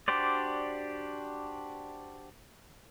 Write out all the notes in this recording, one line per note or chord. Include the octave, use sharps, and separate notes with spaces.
D4 F#4 G4 C5 D5